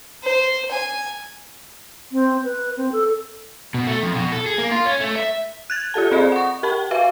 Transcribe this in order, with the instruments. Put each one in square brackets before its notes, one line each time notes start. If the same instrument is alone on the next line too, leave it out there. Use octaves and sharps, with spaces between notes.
[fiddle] C5
G#5
[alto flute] C4
B4
C4
A4
[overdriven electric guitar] B2
A3
F2
B2
A4
G#4
A#3
F4
C#4
A3
E5
[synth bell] F#6 G#6 A6
F4 G4 A4 A5
C4 G#4 C5 D5 D#5 B5
F#5 C#6
G4 A#4 A5 B5
F#4 B4 E5 F5